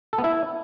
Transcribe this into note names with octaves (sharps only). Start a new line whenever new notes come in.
A4
B3
E4